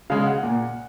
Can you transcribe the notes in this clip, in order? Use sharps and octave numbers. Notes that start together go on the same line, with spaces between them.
C#3 G#3 F5
F#5
A#2